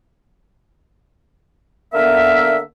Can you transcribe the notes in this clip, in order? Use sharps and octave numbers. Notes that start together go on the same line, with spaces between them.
D3 A#3 B3 A#4 E5